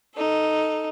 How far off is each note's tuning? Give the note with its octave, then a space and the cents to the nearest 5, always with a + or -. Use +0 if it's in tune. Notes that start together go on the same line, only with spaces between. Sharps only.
D#4 +0 A4 +0